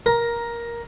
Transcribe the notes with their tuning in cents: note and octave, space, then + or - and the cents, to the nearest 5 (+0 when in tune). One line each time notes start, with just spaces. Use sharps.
A#4 +10